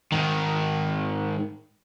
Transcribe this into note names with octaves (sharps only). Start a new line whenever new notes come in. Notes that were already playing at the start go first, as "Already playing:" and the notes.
G#2 D#3